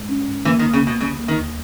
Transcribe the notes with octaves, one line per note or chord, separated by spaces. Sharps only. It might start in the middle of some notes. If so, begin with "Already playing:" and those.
Already playing: G2 G#3
C#4
G#2
E3 A#3
D#3
C#2
C#3
C#2 B2
C#3 G3
A#3
D#3
D#2